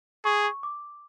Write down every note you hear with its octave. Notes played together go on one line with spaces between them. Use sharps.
G#4 C#6
C#6
D6